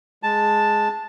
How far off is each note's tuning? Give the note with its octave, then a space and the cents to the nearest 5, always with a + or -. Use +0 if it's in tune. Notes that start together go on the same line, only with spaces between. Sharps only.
G#3 +5 A5 +0